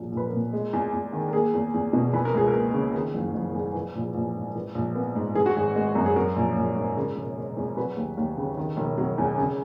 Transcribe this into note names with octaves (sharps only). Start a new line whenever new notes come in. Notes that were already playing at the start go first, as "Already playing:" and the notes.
Already playing: A#1 F#3
A#1
B4
A#4
A#2
G#3
E2
E2
D#3
A#4
A#3 G#4
E2
E2
B2
E3 B4
A#4
C#2 G#4
A#4
A#3
C#3
D#3 G#4
F#1
F#1
E2
E3
A#1
A#1
G#2
E3
A#1
B3
G#2
E3 G#4
F#4
G#1 G#4
G#3
F#2
G#4
F#3 A#4
A#1
A#1
G#2
C#3 A#4
E1
G#3
E2
F#3 B4
D#2
D#2
C#3
D#3
E1
F#3
E2
C#3